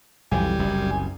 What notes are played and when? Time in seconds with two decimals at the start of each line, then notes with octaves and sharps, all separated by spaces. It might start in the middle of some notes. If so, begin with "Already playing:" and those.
0.31 B1 F2 E3 G3 G#5
0.58 F#1 C2 F#2